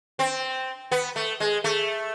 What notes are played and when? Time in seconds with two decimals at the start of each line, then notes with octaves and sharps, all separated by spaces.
0.19 C4
0.92 B3
1.16 A3
1.40 G#3
1.64 A3